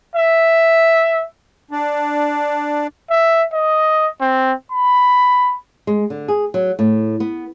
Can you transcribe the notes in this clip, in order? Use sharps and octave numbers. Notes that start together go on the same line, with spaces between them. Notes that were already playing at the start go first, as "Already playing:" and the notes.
E5
D4
E5
D#5
C4
B5
G#3
D3
G#4
F#3
A2
B3